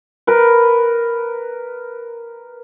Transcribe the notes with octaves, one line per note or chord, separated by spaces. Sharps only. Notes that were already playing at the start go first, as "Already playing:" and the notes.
A#4 B4